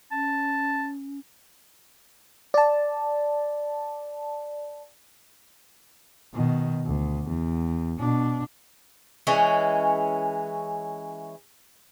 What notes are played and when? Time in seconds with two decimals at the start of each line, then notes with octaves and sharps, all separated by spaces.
0.11 C#4 A5
2.54 D5 A5
6.34 B2 D#3
6.86 D2
7.28 E2
7.99 B2 D4
9.27 E3 G#3 C#4